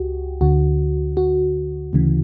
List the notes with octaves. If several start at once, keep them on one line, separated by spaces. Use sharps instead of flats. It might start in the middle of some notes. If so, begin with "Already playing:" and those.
Already playing: C#2 F#4 G4
D2 D3 F#4
F#4
D2 C#3 E3